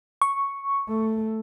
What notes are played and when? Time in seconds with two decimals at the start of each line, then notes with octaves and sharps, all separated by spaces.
0.22 C#6
0.87 A3